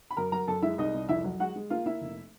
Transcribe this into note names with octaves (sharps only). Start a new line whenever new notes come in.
B5
F#2 A#4 A#5
F#3 A#4 A#5
F#2 A4 A5
G#3 E4 E5
C2 D#4 D#5
C2
F2 E4 E5
F#3
G#3 F#4 F#5
G#3
A#3 F4 F5
A#3 E4 E5
F1